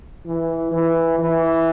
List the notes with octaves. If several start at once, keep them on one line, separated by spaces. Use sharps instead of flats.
E3
E3
E3